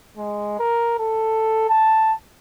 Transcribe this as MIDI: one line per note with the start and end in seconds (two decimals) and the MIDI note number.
0.17 0.58 56
0.59 0.96 70
0.98 1.66 69
1.69 2.13 81